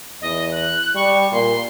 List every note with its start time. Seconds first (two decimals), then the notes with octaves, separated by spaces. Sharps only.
0.22 E2 D#5
0.52 F#6
0.95 G3 C#6
1.32 A#2 C6